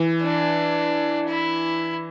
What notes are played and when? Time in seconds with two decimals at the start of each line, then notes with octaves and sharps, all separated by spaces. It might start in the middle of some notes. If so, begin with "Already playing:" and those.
Already playing: E3
0.22 D4
1.29 E4